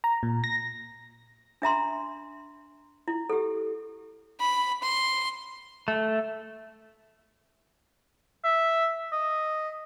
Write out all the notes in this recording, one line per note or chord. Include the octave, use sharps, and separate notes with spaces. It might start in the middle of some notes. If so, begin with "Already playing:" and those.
A#5
A#2
A#6
D4 E5 A#5 C6
E4
G4 A4
B5
C6
A3
E5
D#5